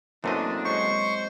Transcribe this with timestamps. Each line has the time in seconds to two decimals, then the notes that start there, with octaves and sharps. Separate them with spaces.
0.24 F#2 E3 A3 A#3 C4 D4 D#5
0.65 F#3 G#3 C5 C#6